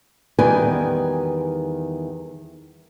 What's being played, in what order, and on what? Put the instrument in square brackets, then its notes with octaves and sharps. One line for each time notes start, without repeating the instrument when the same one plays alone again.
[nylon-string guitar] E2 D#3 G3 B4 G#5